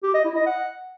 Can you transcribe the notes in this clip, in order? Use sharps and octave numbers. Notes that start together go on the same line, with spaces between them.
G4
D#5
E4
D#5
F#5